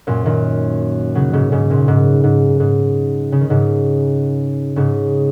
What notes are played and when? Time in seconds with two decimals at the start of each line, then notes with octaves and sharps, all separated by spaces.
0.07 F#2 A#2
0.25 A#2 D#3
1.15 C#3 F#3
1.33 G#2 C#3
1.52 G#2 C#3
1.70 F#2 A#2
1.88 G#2
2.24 G#2
2.60 G#2
3.32 C#3
3.41 D#3
3.50 G#2 C#3
4.76 G#2 C#3